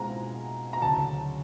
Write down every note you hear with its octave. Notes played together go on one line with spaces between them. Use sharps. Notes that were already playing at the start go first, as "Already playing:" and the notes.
Already playing: B2 G#3 C4 F4 A#5
A#5
D2 C#3 F#3 A5